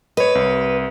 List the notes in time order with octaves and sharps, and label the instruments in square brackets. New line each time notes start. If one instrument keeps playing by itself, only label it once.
[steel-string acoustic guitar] B4 [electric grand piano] C#5 D#5
[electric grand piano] C2